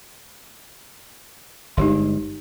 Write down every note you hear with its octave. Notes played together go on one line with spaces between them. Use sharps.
G1 D3 G#3 D#4 G4 C6